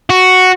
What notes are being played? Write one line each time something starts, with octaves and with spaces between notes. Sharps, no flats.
F#4